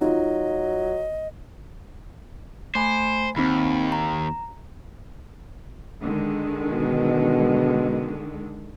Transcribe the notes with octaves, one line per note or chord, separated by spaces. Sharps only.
F#3 D#4 F4 D#5
A3 C5 G#5 B5
D#2 C4 D#4 B5
A#5
D3 D#3 G#3
B2